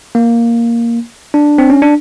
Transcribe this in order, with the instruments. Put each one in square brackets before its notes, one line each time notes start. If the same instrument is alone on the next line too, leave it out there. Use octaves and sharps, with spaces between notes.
[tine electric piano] A#3
D4
C4
C#4
D4